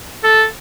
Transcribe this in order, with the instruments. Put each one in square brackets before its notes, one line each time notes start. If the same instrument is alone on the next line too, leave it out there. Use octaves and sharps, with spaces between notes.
[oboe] A4